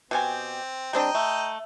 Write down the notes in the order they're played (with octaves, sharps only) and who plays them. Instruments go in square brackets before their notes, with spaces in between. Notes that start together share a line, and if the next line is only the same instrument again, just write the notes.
[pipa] B2 G4 G#5 [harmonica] C4
[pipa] G3 C4 D4 [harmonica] D#5 G5 A#5
[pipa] A3